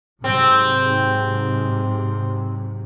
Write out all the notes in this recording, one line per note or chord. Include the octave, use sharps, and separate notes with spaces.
G#2 C3 F#3 C4